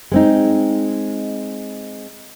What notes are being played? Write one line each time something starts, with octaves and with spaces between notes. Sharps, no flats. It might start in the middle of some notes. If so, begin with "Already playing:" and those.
G#3 C4 D#4